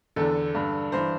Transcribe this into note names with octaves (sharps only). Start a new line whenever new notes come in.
E2 D3 A4
G2 D3
G2 E3 C5